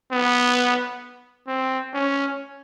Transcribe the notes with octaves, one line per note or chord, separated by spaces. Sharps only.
B3
C4
C#4